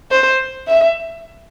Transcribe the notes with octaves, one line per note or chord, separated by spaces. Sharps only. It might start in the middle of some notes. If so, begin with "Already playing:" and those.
C5
E5